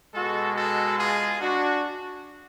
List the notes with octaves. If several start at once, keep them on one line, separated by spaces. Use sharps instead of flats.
B2 G#3 F#4 A4
F#4 A4
F4 G#4
D4 F#4